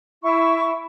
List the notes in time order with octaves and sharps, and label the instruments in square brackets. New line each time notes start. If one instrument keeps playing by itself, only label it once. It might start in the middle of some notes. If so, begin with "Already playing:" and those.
[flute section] E4 C#6